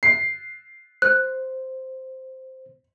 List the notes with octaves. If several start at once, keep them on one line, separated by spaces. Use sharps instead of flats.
C7
C5 F#6